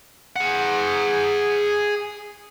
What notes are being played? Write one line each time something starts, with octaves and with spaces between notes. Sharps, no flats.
G#4 F#5